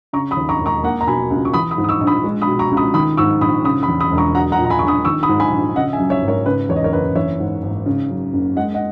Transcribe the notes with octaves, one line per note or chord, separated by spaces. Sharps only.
C#3 A#5 C#6
B5 D#6
D#2
A#5 C#6
E1
A#5 C#6
A#3 F#5 A#5
A#5
B2 G#5 B5
C#2
C#6
E3 B5 D#6
B5 D#6
G#2
D#6
C#6 E6
A#1
B5 D#6
G#3
B5 D#6
B2
A#5 C#6
C#2
B5 D#6
D#3 B5 D#6
G#2 C#6 E6
A#1 B5 D#6
C#3 B5 D#6
B5 D#6
E2
B5 D#6
E1
A#5 C#6
F#3 F#5 A#5
F#5 A#5
A#2
A#5
G#5 B5
A#1 C#6
B5 D#6
D#3 C#6 E6
B5 D#6
G#2
G#5 B5
A#1
C#3 D#5 F#5
E5 G#5
F#2
C#5 E5
G#1
A#4 C#5
C#3 B4
E2 C#5
D#5
A#4 C#5
F#1 B4 D#5
E3 C#5 E5
G#2
G#1
C#3
F#2
F#1
G#3 D#5 F#5
D#5 F#5